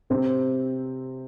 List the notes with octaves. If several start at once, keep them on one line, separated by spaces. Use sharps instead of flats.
C3 C4